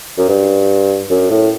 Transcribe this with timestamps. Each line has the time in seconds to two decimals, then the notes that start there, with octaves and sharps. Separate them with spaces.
0.18 F#2
0.28 G2
1.10 F#2
1.30 A2